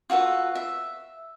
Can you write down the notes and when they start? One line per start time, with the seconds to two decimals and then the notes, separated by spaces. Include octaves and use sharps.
0.10 F4 F#4 A4 B4
0.55 E5